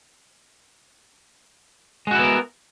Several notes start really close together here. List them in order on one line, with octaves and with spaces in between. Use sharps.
G#3 F#4 E4 B3 A#4